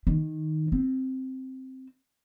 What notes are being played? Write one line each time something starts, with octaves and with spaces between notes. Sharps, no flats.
D#3
C4